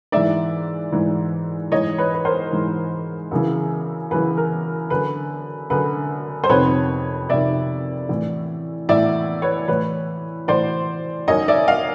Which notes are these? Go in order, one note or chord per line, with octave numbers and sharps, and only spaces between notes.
G#2 E3 D5 E5
G#2 E3
G#2 E3 C#5 D#5
B4 C#5
B4
A#4 C5
G#2 E3
F#2 C#3 E3
F#2 C#3 E3 B4
A#4
F#2 D3 B4
F#2 D3 B4
C5
F2 C3 D#3 B4 C#5
F2 C3 D#3 D5 E5
A2 E3
A2 E3 D5 E5
B4 C#5
A2 E3 B4 C#5
A2 E3 C5 D5
F#2 D#3 C#5 D#5
D5 E5
D#5 F5